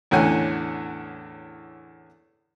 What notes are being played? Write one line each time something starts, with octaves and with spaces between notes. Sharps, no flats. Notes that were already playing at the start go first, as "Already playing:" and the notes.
E2 A2 D3 C#4 F#5 G#5